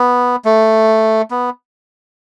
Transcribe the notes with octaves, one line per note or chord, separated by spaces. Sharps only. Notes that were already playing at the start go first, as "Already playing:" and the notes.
Already playing: B3
A3
B3